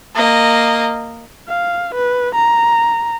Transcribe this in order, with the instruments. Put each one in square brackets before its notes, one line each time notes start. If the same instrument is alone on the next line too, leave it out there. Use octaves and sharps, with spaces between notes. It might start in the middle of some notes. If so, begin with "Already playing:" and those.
[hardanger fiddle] A#3 D#5
[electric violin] F5
B4
A#5